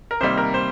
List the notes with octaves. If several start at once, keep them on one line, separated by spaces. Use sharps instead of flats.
A#4
C3 D#3 G3 A#3 C5
A#4
C5